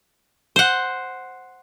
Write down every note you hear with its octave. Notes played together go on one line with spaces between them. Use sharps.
C5 F#5